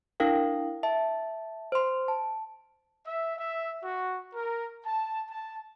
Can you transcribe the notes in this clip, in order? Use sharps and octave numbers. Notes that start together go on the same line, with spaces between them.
D4 E4 A#4 F5 G5
E5 A5
C5 C6
A5
E5
E5
F#4
A#4
A5
A5